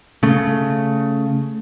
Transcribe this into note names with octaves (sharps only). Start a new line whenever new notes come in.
C#3 A3